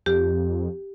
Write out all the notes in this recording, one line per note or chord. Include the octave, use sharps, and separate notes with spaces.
F2 G4